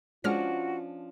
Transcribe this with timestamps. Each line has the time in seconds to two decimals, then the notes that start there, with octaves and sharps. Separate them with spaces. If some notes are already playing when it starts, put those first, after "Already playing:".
0.24 F3 G#3 C#4 D4 F4 F#4 F6 A#6